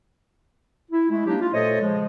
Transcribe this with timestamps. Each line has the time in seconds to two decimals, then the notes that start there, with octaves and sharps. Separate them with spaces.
0.90 E4
1.10 G#3 A3 E4
1.26 F#3 G#3 A#3 D4 D#4 G4
1.41 F4
1.53 A#2 A3 A4 C5 C#5 D#5
1.80 C#3 F3 G#3